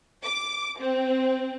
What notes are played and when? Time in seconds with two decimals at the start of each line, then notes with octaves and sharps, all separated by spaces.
0.23 D6
0.80 C4